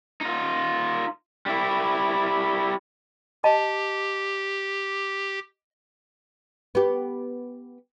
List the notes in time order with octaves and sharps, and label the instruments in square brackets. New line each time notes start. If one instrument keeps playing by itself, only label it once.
[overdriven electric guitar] D#4 F4
G3 E4
[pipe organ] G4 [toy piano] D#5 A5
[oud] B3 G4